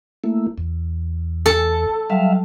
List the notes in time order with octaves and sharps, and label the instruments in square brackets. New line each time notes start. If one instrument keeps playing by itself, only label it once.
[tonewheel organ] A3 A#3 E4
E2
[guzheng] A4
[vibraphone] F#3 G3 [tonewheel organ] E5 F5